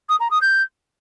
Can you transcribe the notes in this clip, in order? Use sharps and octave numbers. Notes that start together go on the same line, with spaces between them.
D#6
A#5
D#6
G6